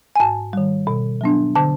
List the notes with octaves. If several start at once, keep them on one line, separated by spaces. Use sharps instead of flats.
G#5
G#2 A5
D#3 G3
B2
F#3 B3 D4
D3 A5